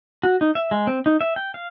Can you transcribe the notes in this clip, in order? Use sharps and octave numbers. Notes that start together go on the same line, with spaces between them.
F#4
D#4
E5
G#3
C4
D#4
E5
G5
F5